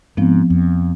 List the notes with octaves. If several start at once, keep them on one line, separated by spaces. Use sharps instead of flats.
G#2 F3 B3 C4
F2